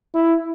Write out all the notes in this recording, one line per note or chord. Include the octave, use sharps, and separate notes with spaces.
E4